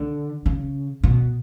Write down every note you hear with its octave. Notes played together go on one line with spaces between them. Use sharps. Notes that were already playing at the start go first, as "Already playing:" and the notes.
Already playing: D3
C#3
B2